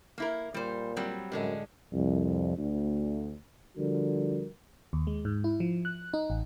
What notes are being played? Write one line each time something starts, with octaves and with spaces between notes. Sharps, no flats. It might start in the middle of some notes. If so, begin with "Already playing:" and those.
A#3 E4 A#4
A#2 G3 C5
F#3 G3 C4
F#2 A2 D3 G#3
C2 F2
D2
D3 F3 G3 F#4 A#4
D#2
G#3
G#2
E4
F3
F#6
D#4
A1